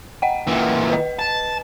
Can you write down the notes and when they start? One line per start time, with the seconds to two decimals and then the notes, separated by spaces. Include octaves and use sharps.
0.22 D#5 F#5 G5
0.47 A#2 E3
0.90 B4 D#5
1.19 A5